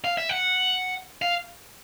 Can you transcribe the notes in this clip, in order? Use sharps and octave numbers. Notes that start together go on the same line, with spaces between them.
F5
E5
F#5
F5